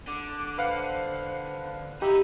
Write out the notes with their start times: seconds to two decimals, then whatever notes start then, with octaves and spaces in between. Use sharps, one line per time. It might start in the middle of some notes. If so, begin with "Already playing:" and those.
0.08 D3 D6
0.58 B4 C5 F5 F#5
2.02 D#4 E4 G4